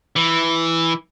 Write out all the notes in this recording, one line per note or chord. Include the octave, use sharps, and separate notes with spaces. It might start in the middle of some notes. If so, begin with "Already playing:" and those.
E3